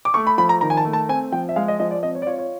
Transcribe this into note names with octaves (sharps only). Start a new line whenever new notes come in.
D6
A3 C#6
B5
F3 B5
A#5
D#3 A#5
G#5
A5
A3
A5
C4 G#5
F3 G5
E5
G#3 F5
D#5
F3 D#5
D5
C4 D#5
C#5
D5
F4 C#5
C#5